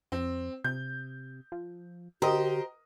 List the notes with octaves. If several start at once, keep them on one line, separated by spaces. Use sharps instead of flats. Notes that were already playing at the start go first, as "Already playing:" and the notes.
F2 C4
C3 G6
F3
D3 F#4 G4 A#4 C5 D#5